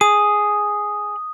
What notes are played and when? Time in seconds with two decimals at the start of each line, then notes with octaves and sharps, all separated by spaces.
0.01 G#4 D#6